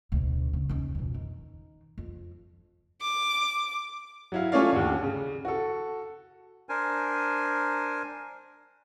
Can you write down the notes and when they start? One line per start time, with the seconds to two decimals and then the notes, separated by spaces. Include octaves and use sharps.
0.12 D2 B2
0.53 C#3
0.69 D#2 C#4
0.95 F2 B2
1.14 D#3
1.98 F2
3.02 D6
4.32 F#3 E4 F5
4.52 A3 C#4 F4 C#5 D5 F5
4.73 D#2 D3
5.03 C#3
5.45 F#4 A4
6.69 D4 A#4 C5 G#5